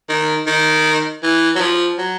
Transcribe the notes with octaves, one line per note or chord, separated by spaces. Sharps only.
D#3
D#3
E3
F#3
F3
F#3